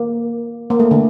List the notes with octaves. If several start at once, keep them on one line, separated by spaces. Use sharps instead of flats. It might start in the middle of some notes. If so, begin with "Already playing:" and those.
Already playing: A#3
A#3
A3
D3